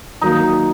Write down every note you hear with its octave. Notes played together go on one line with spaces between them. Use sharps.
D#3 F#3 A#3 D#4